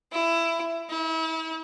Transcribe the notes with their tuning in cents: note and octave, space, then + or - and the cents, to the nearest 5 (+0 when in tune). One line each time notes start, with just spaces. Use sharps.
E4 +15
E4 -35